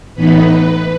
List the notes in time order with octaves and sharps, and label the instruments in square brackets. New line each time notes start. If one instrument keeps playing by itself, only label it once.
[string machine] A2 E3 B3 D#4 B4